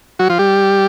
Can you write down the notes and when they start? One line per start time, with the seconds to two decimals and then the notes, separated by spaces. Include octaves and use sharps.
0.19 F#3 F#4
0.30 F3 F4
0.39 G3 G4